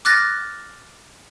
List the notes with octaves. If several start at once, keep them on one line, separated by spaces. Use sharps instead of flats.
D6 F6 F#6 A6 A#6